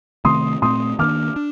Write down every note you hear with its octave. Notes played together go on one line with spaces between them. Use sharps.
C3 D#3 A3 C4 C6 D#6
A#2 A3 C4 C6 D#6
D#3 A#3 D4 D6 F6
D4